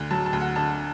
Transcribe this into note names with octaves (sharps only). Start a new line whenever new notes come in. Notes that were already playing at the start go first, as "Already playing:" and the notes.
Already playing: D2 D3
F#3 A5
A5
D2
F#5
D3 A5